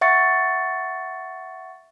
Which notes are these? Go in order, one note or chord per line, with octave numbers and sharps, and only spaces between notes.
E5 F#5 C#6 A6 C#7